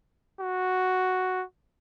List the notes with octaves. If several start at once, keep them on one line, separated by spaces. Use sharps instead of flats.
F#4